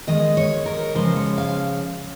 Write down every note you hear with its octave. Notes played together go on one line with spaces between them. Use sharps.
D#3 G#3 D#5
C#5
A#4
C#3 F3 G#3 C5
C#5
F5